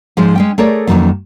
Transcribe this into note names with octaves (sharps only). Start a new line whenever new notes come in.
G#2 F3 G#3
G#3 C#4 G5
A3 G#4 A#4 C#5 D5
F2 D#3 F#3 G3 A#3 C#4